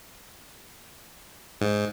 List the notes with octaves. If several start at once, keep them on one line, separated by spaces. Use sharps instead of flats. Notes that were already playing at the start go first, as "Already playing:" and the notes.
G#2